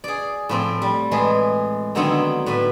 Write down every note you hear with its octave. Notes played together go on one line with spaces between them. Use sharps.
G#4 D5
A2 F3 C4
G3
A2 E3 G#3 G#4
D3 D#3 F#3 B3 C4 E4
A2 B4